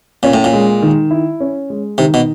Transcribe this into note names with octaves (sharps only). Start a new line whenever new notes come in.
A#2 C#4
A2
A#2
G#3
D#3
E4
C#4
G#3
C3 D#3
B2